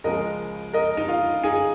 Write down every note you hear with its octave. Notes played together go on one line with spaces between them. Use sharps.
C#2 C#3 F3 G#3 A#4 D#5
A#4 D#5
D#4
F4
D#4 G#4